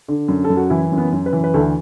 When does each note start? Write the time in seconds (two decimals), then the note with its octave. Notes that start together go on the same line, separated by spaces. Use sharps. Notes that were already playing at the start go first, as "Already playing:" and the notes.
0.08 D3
0.28 F#2
0.44 A4
0.50 F#2
0.57 F#4
0.70 E3 E4
0.92 F#2
0.98 B3
1.13 F#2
1.26 B4
1.33 E3
1.44 B4
1.54 D2 A4